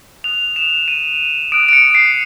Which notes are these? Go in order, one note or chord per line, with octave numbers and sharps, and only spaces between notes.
D#6 F#6 F7
E7
D#7
D#6 F#6 D7
D7
C#7
C7